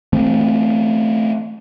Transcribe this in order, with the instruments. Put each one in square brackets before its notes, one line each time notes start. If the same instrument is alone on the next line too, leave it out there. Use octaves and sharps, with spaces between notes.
[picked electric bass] E3 A3 C4